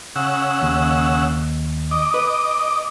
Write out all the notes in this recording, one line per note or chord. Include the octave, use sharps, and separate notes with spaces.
C#3 F#5 E6
D#2
D#5 D6
B4